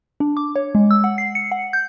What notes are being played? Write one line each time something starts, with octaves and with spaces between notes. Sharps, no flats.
D4
D6
C#5
G#3
E6
F#5
C7
C#7
F#5
G6